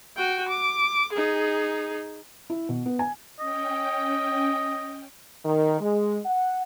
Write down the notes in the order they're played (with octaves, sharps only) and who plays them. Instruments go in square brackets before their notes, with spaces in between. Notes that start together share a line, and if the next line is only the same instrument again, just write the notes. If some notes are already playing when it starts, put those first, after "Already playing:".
[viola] F#4 G5
D6
D#4 G#4
[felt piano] E4
B2
B3
G#5
[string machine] C#4 G5 [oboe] D#5
[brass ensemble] D#3
G#3
F#5